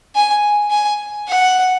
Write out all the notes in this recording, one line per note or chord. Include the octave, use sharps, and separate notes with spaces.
G#5
G#5
F#5